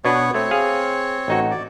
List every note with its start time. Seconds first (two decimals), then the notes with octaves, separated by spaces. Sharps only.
0.05 B2 B3 D4 B4 C#5
0.34 A3 C4 C#5
0.51 G#4 F5
1.28 A1 D#4 F#4
1.51 D5